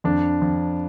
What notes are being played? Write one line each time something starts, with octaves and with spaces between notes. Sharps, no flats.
F2 D4
F2